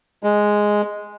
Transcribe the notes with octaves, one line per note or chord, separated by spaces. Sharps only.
G#3